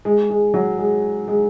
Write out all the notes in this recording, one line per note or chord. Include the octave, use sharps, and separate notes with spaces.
G#3
G#3
F#3
G#3
G#3